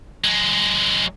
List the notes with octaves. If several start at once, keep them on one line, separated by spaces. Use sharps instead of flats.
F#3 G#3